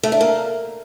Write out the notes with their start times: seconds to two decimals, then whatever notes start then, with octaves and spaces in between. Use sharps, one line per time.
0.03 A3
0.12 D4
0.21 A#3